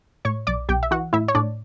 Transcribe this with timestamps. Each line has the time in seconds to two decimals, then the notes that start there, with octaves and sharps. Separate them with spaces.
0.25 A2 C#5 C#6
0.47 B1 D5 D6
0.69 B1 G4 G5
0.83 E5
0.91 E3 F#4 F#5
1.13 A2 E4 E5
1.28 C#5
1.35 A2 D4 D5